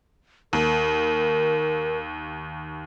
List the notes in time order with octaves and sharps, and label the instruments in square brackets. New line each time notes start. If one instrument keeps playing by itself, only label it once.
[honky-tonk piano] D#2 [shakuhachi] A#4